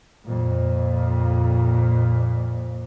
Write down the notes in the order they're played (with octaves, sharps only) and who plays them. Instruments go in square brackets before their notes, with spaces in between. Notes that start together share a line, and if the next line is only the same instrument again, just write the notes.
[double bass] F2 A#2